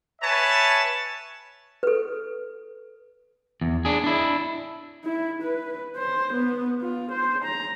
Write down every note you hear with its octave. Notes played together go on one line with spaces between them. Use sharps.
B4 C#5 E5 G#5 A5
A4 B4
E2
D4 G#4
D4 E4
E4
B4
C5
B3
F4
C5
A#5